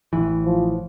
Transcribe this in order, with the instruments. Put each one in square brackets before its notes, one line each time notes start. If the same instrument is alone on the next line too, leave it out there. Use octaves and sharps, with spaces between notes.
[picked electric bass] A1 E3
[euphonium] F3